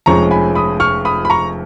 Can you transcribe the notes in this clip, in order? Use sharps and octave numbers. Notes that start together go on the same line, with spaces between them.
F1 F2 F3 G#3 C#4 A#5 C#6
G#5 B5
B5 D#6
C#6 F6
B5 D#6
B5
A#5 C#6